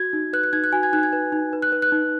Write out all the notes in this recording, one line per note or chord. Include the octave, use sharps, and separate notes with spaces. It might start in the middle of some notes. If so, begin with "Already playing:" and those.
Already playing: F#4 G#6
D#4
B4 F#6
F#6
D#4 G#6
F#6
F#4 G#5
G#6
D#4 F#6
G#6
B4
D#4
B4
F#6
B4
F#6
D#4